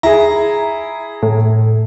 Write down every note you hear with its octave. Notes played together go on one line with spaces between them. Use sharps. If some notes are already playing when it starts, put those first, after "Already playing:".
E4 G#4 A#5
A2